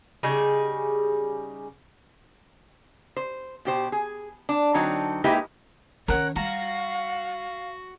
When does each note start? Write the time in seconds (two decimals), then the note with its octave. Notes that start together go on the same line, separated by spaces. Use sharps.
0.23 C#3 G3 D#4 G#4
3.17 C5
3.65 B2 G4 C5
3.92 G#4
4.49 D4
4.74 D3 F#3 C4 D#4
5.24 G#3 A#3 D#4 E4 G4 B4
6.08 D#3 C#4 A#4 C#5 F#5
6.36 G3 F#4 F5 A#5